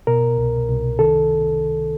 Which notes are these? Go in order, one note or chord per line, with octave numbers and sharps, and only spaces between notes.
B2 A#4
C2
C2
D#3 A4